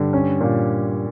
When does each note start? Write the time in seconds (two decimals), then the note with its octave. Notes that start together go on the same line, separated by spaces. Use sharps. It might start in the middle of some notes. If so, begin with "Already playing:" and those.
Already playing: G2 D3
0.13 C#4
0.41 A#2